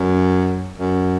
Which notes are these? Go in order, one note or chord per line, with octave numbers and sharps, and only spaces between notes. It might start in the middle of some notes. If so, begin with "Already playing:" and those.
Already playing: F#2
F#2